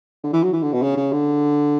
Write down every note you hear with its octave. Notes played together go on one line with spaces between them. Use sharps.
D3
E3
F#3
E3
D3
B2
C#3
C#3
D3